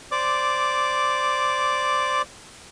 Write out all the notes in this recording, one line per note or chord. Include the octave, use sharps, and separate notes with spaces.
C5 D5 D6